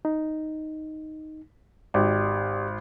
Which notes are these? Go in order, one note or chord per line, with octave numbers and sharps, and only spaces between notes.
D#4
G#1 G4 D5